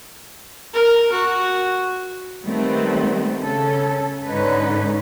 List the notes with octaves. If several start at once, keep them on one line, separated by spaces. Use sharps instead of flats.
A#4
F#4
D#3 G3 A3 B3 C4
C#3 C#4 A4
G#2 D3 G#3 C#4 D#4 B4